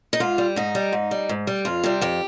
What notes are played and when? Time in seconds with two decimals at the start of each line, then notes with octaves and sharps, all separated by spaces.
0.13 D#4
0.20 G#2 F4
0.38 G3
0.56 G#2 D#4
0.75 G3
0.92 G#2
1.11 G3
1.29 G#2
1.47 G3
1.65 F2 F4
1.83 C3 G3
2.01 F2 G4